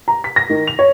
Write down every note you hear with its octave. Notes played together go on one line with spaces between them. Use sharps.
A#5
B6
A#6
D#3
F7
C#5